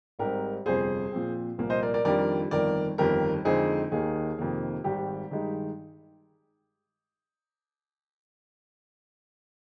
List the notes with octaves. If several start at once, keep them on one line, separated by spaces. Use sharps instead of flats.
G#1 G#2 G3 C4 D#4 G4 A#4
G1 F2 C3 F3 G#4 C5
A#2 F3 C4
C2 A#2 F3 A#3
C5 D#5
A#4 D5
A#4 D5
F2 D#3 G3 D4 F4 A#4 D5
G1 F2 D#3 A#4 D5
G1 F2 D#3 G4 A#4
F2 D3 G#3 C4 D#4 G#4
D#2 D#3 A#3 D#4 G#4
F2 C3 D#3 A#3
G#1 G#2 D#3 G3 G4
G2 D#3 G#3 D#4